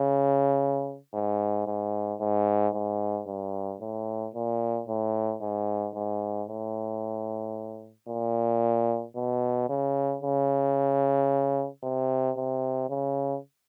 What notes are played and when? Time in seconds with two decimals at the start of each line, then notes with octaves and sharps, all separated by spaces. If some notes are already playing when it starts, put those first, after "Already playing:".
Already playing: C#3
1.13 G#2
1.67 G#2
2.20 G#2
2.74 G#2
3.27 G2
3.80 A2
4.34 A#2
4.88 A2
5.41 G#2
5.95 G#2
6.48 A2
8.08 A#2
9.16 B2
9.69 C#3
10.23 C#3
11.83 C3
12.36 C3
12.90 C#3